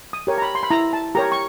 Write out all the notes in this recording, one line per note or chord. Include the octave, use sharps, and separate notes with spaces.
D#6
G4 A#4 C#5
A#5
B5
C6
B5
E4 A#5
A5
G4 A#4 C#5 A#5
C#6